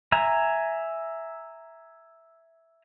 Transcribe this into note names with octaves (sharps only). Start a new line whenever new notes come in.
E5 G#5 A#5